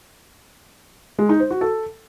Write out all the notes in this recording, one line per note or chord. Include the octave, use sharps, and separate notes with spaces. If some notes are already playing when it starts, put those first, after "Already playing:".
G#3
D#4
C5
F#4
A4